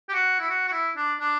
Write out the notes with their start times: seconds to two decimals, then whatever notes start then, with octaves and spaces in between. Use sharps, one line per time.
0.09 G4
0.13 F#4
0.40 E4
0.49 F#4
0.68 F#4
0.72 E4
0.97 D4
1.20 D4